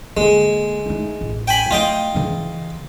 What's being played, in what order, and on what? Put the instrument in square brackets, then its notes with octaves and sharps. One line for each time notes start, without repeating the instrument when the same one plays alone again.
[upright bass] D3 A#3 [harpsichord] G#3
[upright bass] A3 D#4
A1
[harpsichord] G5 G#5 B5
[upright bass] F#3 A3 [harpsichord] F4 D#5 G5
[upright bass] C#3 E3